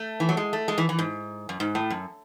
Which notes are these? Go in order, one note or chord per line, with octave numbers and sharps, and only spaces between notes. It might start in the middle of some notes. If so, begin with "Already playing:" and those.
Already playing: A3
E3
F#3
G#3
A3
G#3
E3
E3
G#2
F#2
G#2
A2
F#2